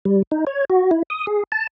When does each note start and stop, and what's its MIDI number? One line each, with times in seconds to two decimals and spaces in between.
0.05 0.22 55
0.31 0.45 63
0.47 0.65 73
0.70 0.91 66
0.91 1.03 64
1.10 1.26 87
1.27 1.43 68
1.52 1.67 81